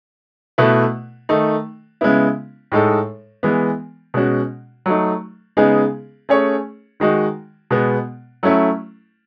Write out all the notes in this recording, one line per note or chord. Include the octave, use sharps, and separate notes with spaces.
B2 A3 E4 B4
D#3 A3 D#4
C#3 G#3 B3 E4
A2 G#3 D#4 A4
E3 G#3 B3
B2 G#3 C#4 F#4
F#3 A3 D#4
C#3 G#3 B3 D#4 G#4
A3 C#4 G#4 C#5
D#3 G#3 D#4 F#4
B2 G#3 B3
F#3 A3 C#4 E4